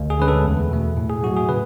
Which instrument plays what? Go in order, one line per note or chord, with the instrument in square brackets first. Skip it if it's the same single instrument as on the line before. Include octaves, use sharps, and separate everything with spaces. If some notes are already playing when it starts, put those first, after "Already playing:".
Already playing: [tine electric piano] D2
G#4
D3 G#3 C#4 B4
A4
E2
B2 A3
A2
G#4
F#3 F#4
A3
G#4
C#3 B4